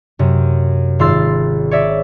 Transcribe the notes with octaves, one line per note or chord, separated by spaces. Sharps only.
F#2 C3
G#1 F4 C6 E6 A6
C#5 D5 E5